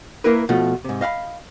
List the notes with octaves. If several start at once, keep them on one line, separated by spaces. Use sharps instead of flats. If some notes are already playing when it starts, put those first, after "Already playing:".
A#3 E4 A#4 B4
B2 F3 A3 F4
G#2 C3
D#5 F5 F#5 B5